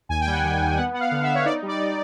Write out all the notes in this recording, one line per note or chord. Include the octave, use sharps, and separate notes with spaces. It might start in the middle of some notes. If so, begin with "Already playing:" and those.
D#2 G#5
G5
G3 F#5
D#3 G5
D#2
B3 F#5
B3 F#5
F5
D3
E5
B3
C#5
D#4 D5
G3
D5
D#4